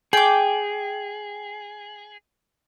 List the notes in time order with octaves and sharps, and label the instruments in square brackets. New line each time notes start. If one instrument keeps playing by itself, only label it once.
[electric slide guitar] G#4 [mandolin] G5 D6